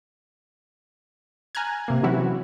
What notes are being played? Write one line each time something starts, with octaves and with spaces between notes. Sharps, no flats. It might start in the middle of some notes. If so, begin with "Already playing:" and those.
G#5 A#5 F6 F#6 G#6
C3 A#3
E3 F#3 C4 C#4 E4 F#4